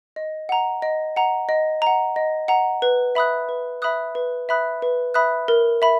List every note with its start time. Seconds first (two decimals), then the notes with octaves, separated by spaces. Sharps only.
0.16 D#5
0.49 F#5 A#5
0.82 D#5
1.16 F#5 A#5
1.49 D#5
1.82 F#5 A#5
2.16 D#5
2.48 F#5 A#5
2.82 B4
3.15 E5 B5 D#6 F#6
3.49 B4
3.82 E5 B5 D#6 F#6
4.15 B4
4.49 E5 B5 D#6 F#6
4.82 B4
5.14 E5 B5 D#6 F#6
5.48 A#4
5.82 E5 B5